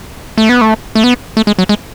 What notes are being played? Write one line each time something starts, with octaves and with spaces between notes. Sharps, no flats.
A3
B3
A3
A3
B3
A3
G#3
F#3
G#3